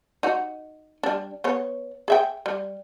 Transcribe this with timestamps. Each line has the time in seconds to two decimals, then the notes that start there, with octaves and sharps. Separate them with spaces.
0.23 D#4 F#4
1.03 G3 D4
1.44 B3 C#5
2.08 G#4 E5 G5
2.46 G3